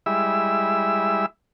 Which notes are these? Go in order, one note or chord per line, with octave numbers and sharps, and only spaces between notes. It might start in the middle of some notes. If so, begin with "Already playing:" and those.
G3 G#3 E4 E5 E6